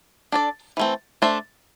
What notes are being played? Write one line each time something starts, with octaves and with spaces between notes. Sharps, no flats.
D4 A4 D5
E3 A3 C4
A3 D4 C5 E5